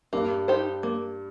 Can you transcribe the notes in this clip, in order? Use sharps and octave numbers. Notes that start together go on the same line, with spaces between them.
G2 A#3
D#4 G4 C5
A#3